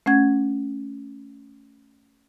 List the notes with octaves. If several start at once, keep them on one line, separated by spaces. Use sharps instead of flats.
A3 C#4 F#5 G#6